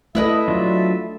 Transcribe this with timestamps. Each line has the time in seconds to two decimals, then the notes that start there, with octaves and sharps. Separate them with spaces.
0.15 A3 E4 A4 B4 D#5 E5
0.48 F#3 D4 F4